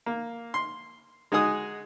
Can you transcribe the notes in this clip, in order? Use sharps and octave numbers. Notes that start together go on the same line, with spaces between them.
A#3
C6
G#3 D#4 F#4 G#4 D#6